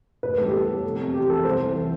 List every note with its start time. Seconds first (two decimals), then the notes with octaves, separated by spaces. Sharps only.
0.23 A1 B4
0.38 G3 A4
0.46 G4
0.53 B3 A4
0.68 A2
0.84 F1
0.99 C3
1.14 E3 G4
1.29 E2 A4
1.44 C2 C5
1.60 E3